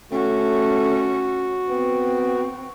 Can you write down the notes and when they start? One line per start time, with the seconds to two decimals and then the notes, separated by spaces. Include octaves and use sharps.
0.12 A3 C#4 F#4
1.68 B3 C4